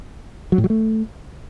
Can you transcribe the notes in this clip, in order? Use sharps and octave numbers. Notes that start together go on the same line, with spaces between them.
F#3
A2
F#3
A3